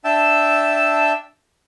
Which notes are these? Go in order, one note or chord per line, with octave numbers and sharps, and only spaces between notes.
D4 E5 G5 A5 E6